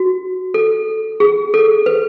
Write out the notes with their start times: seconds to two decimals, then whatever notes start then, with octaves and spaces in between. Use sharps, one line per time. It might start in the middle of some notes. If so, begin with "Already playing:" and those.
Already playing: F#4
0.54 A4
1.20 G#4
1.54 A4
1.86 B4